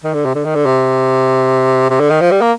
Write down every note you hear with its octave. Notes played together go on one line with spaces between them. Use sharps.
D#3
D3
C3
D3
D#3
D3
C3
C3
D3
D#3
F3
G3
A#3